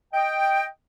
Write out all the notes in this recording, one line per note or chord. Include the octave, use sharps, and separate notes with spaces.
D#5 G5